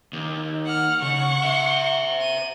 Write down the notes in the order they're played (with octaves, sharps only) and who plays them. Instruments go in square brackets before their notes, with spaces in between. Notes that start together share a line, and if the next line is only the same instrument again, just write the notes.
[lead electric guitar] D#2
[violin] F#5 F6
[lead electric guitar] C#3 [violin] F#5 C#6
[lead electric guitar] C5 E5
[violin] D#7